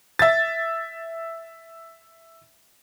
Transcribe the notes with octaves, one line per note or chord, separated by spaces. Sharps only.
E5 A6